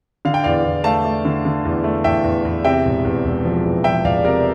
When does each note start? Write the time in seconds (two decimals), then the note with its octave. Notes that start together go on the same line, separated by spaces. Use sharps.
0.25 D3 F5
0.34 G5
0.44 E2 D5 F5
0.65 E2
0.84 A3 F5 A5
1.04 A3
1.25 D3
1.45 D3
1.65 E2
1.84 A3
2.04 E2 E5 G5
2.24 E2
2.45 E2
2.65 C3 E5 G5
2.85 E1
3.05 E2
3.25 E1
3.45 F3
3.65 E2
3.84 F3 E5 G5
4.04 E1 D5 F5
4.24 C3 A#4 D5